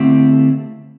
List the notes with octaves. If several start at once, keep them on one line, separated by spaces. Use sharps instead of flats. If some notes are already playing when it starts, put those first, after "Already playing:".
Already playing: D3 A3 C4 E4 G4